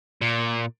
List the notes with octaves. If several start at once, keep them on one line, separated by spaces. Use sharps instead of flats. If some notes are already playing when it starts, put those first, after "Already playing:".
A#2